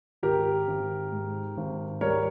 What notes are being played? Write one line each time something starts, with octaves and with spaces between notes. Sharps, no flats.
G#1 G4 A#4
G#1
G#2
G#1
G3 A#4 C#5